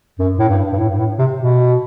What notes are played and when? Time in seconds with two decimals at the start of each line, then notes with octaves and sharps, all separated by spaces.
0.19 F#2
0.39 A2
0.49 G2
0.73 G2
0.78 A2
0.89 G2
0.99 A2
1.19 C3
1.39 B2